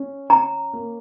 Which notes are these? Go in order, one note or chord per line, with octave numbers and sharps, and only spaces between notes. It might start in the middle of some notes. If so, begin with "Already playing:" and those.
Already playing: C#4
C#4 A#5
A#3